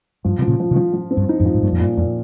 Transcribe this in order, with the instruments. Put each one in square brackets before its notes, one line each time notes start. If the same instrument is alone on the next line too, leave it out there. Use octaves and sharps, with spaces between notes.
[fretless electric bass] G2 [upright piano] F3
[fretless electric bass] C3 [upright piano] F3
[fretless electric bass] A#2 C#3
[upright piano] F3
[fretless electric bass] C3 D#3
[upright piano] F3
F3
C4
[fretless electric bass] G2
[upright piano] D#4
[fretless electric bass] F2 G#2
[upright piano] F3
[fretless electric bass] G#2
[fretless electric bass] G2 [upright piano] A#2
[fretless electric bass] F2
[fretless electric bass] G2 [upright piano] A#2
[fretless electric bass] F2 [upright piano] A#2